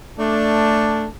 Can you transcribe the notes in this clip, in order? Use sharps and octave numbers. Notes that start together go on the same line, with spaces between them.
A3 D4